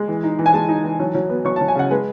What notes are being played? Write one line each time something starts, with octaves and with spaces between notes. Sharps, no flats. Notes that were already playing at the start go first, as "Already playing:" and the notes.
Already playing: G#3
E3
D#4
E3
G#5
G#3 A5
D#4
E3
F#3
F#3
B3
F#3 C#6
F#3 A5
G#5
C#3 F#5
G#3 B4